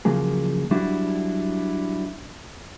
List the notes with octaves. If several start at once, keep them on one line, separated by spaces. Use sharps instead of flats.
C#3 F3 F#3 A#3 G#4
F#3 G3 D4 E4 F#4